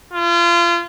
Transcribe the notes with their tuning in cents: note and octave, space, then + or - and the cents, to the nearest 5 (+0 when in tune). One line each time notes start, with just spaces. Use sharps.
F4 -30